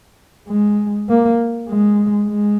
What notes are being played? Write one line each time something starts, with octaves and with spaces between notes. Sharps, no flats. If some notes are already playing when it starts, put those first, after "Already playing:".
G#3
A#3
G#3
G#3